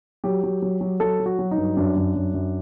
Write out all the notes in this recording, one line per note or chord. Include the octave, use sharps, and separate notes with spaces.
F#3 G4
F#3
F#3
F#3
F#3 A4
F#3
F#4
F#3
D#4
G2
F#2 D4
F#2
F#2
F#2